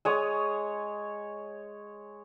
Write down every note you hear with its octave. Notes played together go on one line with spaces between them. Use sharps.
G#3 C#5 D#6